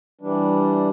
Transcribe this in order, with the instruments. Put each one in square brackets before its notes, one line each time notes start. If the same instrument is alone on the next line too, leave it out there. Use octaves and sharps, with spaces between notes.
[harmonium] E3 G3 D4